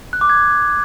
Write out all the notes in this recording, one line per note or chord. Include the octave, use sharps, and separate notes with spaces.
F#6
D6
G#6